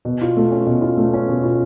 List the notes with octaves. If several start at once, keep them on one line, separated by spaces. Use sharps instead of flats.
B2
F4
A3
C#4
B2
F4
A3
C#4
B2
F4